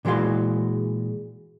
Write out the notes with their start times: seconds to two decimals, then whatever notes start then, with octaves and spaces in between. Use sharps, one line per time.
0.05 A#2 E3 G#3 F#4 F5 C6